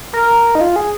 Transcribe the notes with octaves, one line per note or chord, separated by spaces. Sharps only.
A#4
D#4
F4
G#4